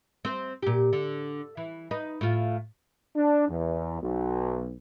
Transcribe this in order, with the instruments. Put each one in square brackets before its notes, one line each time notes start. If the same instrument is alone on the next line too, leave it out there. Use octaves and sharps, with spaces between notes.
[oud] C4 C5
A#2 G4
D3
E3
D#4 B4
A2 F4
[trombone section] D4
E2
B1